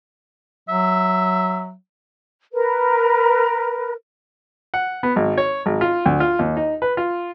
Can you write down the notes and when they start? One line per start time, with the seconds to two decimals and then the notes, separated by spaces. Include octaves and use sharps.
0.69 F#3 E5
2.53 A#4 B4
4.74 F#5
5.03 B3
5.16 G#1
5.38 C#5
5.66 G#1
5.81 F4
6.06 D2
6.20 F4
6.39 D#2
6.57 D#4
6.82 B4
6.97 F4